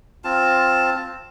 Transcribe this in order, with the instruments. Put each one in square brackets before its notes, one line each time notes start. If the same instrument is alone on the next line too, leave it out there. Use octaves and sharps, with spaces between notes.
[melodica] C4 F4 A5